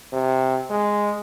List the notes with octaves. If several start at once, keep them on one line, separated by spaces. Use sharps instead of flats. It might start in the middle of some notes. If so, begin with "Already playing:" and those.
C3
G#3